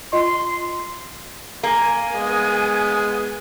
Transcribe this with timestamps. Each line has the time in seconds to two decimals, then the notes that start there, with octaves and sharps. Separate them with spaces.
0.13 F4 D#5 C6
1.63 A#3 G#5
2.14 G#3 B3